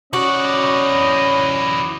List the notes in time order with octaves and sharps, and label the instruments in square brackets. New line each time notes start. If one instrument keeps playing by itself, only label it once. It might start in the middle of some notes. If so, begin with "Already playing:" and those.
[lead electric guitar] E3 D5 [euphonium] C#4 [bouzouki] F#4 [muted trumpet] D#5